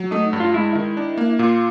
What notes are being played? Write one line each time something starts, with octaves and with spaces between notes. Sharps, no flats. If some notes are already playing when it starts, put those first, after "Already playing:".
Already playing: F#3
A3 D#4
G2
F4
G#3 E4
D#3 E4
D4
A#3
A#2 F4